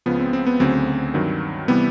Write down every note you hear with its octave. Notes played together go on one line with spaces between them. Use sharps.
C#2 C#3 F3 B3
C4
C4
B3
D2 C#3 F#3 C4
G2 D#3 F#3
C3 E3 G3 B3